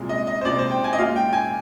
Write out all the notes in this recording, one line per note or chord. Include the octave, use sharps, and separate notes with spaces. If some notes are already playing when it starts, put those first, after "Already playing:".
Already playing: C2 A#2 G#3
D#5
D#5
C5
C2 A#2 G#3 D5
C5
G5
G#5
D#5
A#1 A#2 G#3 F5
G5
G#5